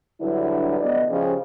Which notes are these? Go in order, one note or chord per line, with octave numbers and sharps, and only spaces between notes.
D3 F#3 G3 D4 E4 B4
D2 B3 D5 D#5
C#3 F3 G4